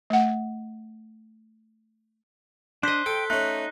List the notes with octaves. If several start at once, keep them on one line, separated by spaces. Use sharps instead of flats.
A3 F#5
D4 C5 D#5 F#6 B6 G7
A4 G5
A3 C#4 D#4 F#6